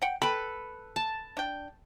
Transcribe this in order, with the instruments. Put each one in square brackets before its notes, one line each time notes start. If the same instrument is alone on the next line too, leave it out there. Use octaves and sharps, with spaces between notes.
[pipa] F#5 G5
[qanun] A4 B4 [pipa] G5 B5
[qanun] A5
[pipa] D4 G5